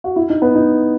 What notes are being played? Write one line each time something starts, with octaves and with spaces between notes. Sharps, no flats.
F#4
E4
D#4
B3
D#4